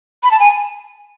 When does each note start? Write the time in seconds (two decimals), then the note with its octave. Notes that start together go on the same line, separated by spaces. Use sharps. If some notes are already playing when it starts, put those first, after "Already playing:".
0.23 B5
0.31 A5
0.40 G#5